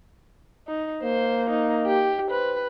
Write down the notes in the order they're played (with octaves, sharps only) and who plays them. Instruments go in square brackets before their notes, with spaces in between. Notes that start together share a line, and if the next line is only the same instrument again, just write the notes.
[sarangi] D#4
[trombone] A#3 [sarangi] C5
[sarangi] D#4
G4
[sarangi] B4 [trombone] C5